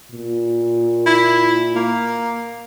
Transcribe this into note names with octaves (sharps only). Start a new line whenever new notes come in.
A#2
E4
A#3